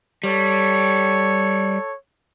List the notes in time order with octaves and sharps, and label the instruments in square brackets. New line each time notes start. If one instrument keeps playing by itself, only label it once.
[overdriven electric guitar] G3 [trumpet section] A4 C#5